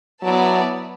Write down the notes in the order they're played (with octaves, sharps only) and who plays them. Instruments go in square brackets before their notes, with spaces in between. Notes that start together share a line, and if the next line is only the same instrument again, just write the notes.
[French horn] F#3 [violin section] B3 E4 D5 A5